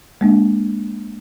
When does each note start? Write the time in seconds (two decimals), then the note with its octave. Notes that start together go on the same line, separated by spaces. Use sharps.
0.21 G#3 A#3 D4